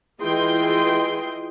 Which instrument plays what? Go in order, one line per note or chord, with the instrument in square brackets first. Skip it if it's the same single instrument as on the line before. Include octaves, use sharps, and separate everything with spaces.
[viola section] E3 F4 G#4 D#5 G5 C6